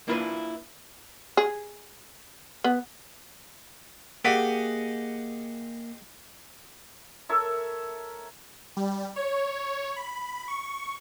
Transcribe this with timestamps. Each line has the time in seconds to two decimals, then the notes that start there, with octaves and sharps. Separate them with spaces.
0.08 A#3 D4 E4 F4 A#4 B4
1.37 G#4
2.64 B3
4.25 A#3 G4 G#4 D#5 F#5 B6 D7
7.29 A4 A#4 C#5 E5
8.77 G3
9.16 C#5
9.96 B5
10.48 C#6